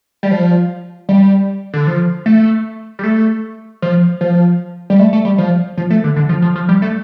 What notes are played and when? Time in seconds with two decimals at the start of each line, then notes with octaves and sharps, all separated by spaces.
0.23 G3
0.31 F3
1.09 G3
1.73 D3
1.87 F3
2.26 A3
2.99 G3
3.04 A3
3.82 F3
4.21 F3
4.90 G3
4.99 A3
5.13 A3
5.25 G3
5.38 F3
5.77 F3
5.90 A3
6.04 D3
6.16 D3
6.29 F3
6.42 F3
6.55 F3
6.69 G3
6.82 A3